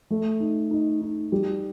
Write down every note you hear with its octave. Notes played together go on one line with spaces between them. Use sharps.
A3
D#4
D#4
D#4
G3